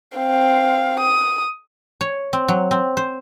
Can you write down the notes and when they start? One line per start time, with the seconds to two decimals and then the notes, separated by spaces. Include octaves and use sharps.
0.16 C4 F5
1.00 D#6
2.01 C#5
2.33 C4
2.48 F#3
2.71 C4
2.97 C5